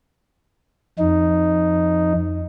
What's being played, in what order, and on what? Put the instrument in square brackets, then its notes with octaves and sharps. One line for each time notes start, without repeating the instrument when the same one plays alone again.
[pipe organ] F2 D#4